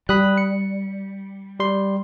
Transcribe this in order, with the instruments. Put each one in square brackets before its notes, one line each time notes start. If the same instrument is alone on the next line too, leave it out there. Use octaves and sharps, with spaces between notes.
[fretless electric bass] G3 [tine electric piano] B5 D#6 F#6
[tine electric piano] C#7
G3 C6